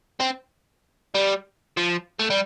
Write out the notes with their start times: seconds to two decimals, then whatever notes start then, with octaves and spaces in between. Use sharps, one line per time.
0.20 C4
1.14 G3
1.77 F3
2.19 A3
2.30 G3